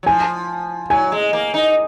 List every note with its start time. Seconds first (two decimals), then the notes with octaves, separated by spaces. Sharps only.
0.03 F#3
0.06 F3 G#5
0.90 F#3 G#5
1.12 G#3
1.33 A#3
1.54 D#4